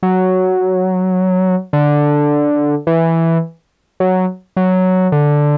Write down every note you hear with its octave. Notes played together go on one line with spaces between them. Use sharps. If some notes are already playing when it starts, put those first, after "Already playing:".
F#3
D3
E3
F#3
F#3
D3